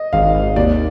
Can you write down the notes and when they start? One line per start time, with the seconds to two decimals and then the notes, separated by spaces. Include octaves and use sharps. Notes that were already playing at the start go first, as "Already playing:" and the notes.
Already playing: D#5
0.13 G#1 F5
0.35 G#1
0.56 D#2 D5